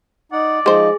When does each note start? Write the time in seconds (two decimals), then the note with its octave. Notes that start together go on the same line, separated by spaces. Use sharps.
0.32 D#4 D5 F#5
0.66 F3 G#3 D#4 G#4 C5 D#5